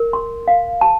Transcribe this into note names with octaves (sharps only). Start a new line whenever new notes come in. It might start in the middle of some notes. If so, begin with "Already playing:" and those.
Already playing: A#4
C6
F5
A5